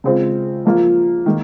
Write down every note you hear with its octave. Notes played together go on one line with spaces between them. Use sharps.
C#3 G#3 C4 F4
F3 A#3 F4
D#3 A#3